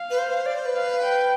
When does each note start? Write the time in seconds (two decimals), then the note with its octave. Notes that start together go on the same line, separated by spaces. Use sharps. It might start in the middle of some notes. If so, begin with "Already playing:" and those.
Already playing: F5
0.10 B4
0.18 C5
0.46 D5
0.55 C5
0.65 B4
0.75 F5
1.03 G5